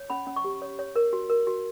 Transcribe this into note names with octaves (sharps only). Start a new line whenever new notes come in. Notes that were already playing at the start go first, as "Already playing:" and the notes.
Already playing: C#5
C#4 B5
C#4
C#6
G4
C#5
C#5
A#4
F#4
A#4
F#4